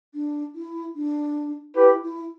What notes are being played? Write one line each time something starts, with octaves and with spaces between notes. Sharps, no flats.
D4
E4
D4
E4 G4 B4
E4